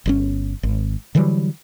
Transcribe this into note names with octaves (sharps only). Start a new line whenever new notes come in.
G1 C#3 C#4
G#1
D3 E3 F#3 G3